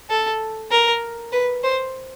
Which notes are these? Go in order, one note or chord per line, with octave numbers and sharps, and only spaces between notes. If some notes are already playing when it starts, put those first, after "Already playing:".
A4
A#4
B4
C5